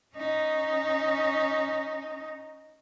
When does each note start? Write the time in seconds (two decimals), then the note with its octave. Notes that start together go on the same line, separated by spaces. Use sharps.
0.16 C#4 D#4